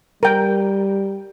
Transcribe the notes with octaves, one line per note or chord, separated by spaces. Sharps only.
G3 A#4 G5